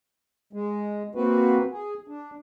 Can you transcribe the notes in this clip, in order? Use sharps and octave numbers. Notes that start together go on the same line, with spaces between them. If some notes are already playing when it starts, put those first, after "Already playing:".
G#3
A#3 C4 F#4 B4
G#4
D4